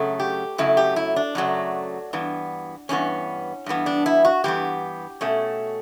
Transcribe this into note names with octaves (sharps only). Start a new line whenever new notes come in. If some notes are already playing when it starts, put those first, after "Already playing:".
Already playing: F#2 C#3 F#3 A3
G4
F#2 C#3 F#3 A3 E4
G4
E4
D4
F#2 C#3 F#3 A3
G2 E3 B3
G2 E3 B3 C#4
G2 E3 B3
D4
E4
F#4
G2 E3 B3 G4
B2 A3 C#4